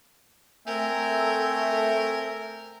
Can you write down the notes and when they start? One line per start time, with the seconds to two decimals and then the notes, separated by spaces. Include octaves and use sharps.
0.67 A3 C4 A#4 E5 G#5 E6 G6